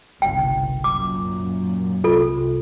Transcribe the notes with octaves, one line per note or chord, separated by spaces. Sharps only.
G1 C2 C#3 G5
F#2 A#2 D6
C2 C3 F4 A4